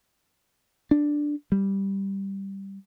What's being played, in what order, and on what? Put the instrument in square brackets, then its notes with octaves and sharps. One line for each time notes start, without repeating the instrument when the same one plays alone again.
[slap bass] D4
G3